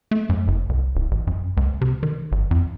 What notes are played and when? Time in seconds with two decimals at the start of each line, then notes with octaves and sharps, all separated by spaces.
0.11 A3
0.29 F#2
0.48 F#1
0.69 C2
0.95 D1
1.11 A1
1.27 F#2
1.57 C#2
1.81 C3
2.03 D#3
2.32 G#1
2.51 F2